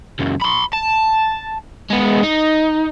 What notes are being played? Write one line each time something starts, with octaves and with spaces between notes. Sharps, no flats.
C#2 F#2
B5 C6
A5
G#3 B3
D#4